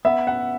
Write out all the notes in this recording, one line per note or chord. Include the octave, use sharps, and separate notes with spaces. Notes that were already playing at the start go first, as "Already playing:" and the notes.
B3 E5
F#5